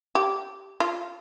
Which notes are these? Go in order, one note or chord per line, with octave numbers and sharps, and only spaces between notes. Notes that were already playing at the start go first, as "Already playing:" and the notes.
G4
F4